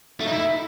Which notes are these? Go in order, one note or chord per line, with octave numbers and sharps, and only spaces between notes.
A3
D#4
E4